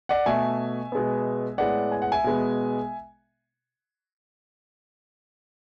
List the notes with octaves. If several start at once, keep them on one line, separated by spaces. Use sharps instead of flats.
D5 F#5
B2 A3 E5 G#5
B2 G#3 B3
A2 G#3 B3 D5 F#5
G#5
F#5
E5 G#5
B2 G#3 B3